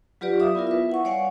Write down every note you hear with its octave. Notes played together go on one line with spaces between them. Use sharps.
F#3 F4 G4 B4 D5
D5 E5 F5 D6 D#6
B3 E4 F4 A#4
B4 E5
E4 F#5 C#6
G3 C#5 D5 F5 F#5 G#5